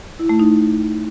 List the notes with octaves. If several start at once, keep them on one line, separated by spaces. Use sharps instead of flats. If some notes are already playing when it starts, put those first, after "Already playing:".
E4
A3
D#4